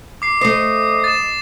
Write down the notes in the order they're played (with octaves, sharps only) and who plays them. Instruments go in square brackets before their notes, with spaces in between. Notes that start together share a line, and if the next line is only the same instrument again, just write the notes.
[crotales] D6 C7
[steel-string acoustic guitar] A3 C5 [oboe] D#5 [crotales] C7
[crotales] A6 E7